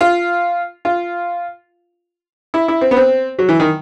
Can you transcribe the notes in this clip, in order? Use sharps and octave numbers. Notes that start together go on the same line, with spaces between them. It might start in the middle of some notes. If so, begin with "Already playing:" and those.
F4
F4
E4
E4
C4
B3
C4
F#3
E3
D#3